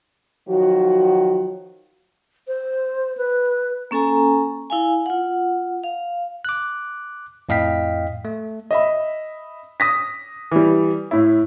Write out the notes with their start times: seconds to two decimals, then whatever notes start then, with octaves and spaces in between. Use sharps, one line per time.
0.48 D#3 F3 F#3 F#4
2.48 C5
3.17 B4
3.91 A#3 C#4 A4 G#5 A#5
4.70 E4 F5 G#5
5.06 F4 F#5
5.83 F5
6.45 D6 F#6
7.49 F2 A2 D#5 F5 G5 B6
8.25 A3
8.71 D#5 E5 B5
9.80 D#6 A#6 B6
10.51 E3 G3
11.11 A2 E4